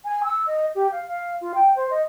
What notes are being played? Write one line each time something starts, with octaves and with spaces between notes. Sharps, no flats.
G#5
E6
D#5
G4
F5
F5
F4
G5
C5
D#5